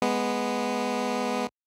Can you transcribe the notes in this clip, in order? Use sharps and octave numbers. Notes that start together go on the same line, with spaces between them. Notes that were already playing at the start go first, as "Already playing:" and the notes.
G#3 B3